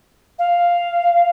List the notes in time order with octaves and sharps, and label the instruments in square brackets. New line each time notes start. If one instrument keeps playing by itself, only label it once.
[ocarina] F5